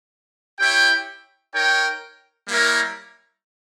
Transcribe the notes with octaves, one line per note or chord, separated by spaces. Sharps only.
E4 G4 C#5 G5
D#4 A#4 C#5 G5
G3 A#3 E4 A#4 C#5